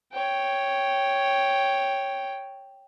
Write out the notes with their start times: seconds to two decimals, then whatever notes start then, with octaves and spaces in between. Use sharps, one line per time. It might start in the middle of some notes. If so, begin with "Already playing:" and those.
0.13 C#5 G5